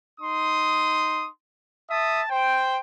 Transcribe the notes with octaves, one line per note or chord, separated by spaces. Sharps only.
D#4 C6 D#6
E5 A5 D#6
C5 G5